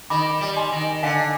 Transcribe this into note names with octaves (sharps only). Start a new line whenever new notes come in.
D#3 B5 D6
G3
G#5 C6
D#3
D3 F5 G#5